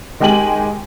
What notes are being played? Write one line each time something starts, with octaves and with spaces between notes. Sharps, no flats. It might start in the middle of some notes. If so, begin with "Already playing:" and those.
D#3 G#3 G4 G5 G#5 F#7